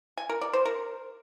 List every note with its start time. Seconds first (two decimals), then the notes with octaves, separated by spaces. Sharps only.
0.17 G#5
0.29 A#4
0.41 D5
0.53 C5
0.65 A#4